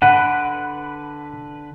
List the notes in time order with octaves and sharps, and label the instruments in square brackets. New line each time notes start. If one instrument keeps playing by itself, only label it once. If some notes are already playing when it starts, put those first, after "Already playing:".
[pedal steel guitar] D3 B4 [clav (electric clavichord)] F#5